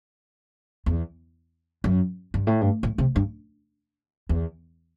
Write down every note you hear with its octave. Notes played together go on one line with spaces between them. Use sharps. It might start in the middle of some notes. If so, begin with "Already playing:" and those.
E2
F#2
G2
A2
G2
A2
C3
G2
E2